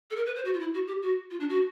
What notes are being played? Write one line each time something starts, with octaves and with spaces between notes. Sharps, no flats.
A4
A#4
B4
C5
F#4
F4
E4
F#4
G4
F#4
F4
D4
F#4